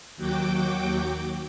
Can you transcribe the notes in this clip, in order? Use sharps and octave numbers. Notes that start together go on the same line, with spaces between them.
D#2 F#3 F#4 G5 D6